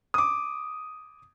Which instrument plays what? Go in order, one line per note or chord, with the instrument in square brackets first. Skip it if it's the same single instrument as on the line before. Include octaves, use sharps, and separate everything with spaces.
[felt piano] D6 D#6